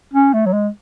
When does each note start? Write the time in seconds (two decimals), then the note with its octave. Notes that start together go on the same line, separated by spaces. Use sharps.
0.14 C#4
0.33 A3
0.46 F#3
0.53 G#3